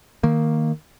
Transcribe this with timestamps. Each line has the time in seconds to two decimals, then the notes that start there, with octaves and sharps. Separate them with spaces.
0.23 D#3 A#3